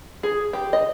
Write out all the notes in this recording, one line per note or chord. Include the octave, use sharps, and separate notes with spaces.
G#4
G4
D#5